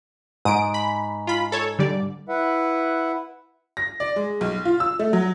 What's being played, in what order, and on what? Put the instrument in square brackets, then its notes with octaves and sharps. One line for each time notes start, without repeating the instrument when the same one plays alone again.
[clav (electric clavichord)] G#2 [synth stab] D#6 D7
[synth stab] B5
F4 B5
A4 C#5
D3 G3 D5
[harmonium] E4 B4 E5 F#5
[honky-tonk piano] A#6
D5
G#3
B1
F4
E6
A3
F#3